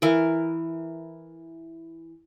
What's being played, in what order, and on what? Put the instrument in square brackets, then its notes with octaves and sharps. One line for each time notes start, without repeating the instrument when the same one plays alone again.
[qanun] E3 A#4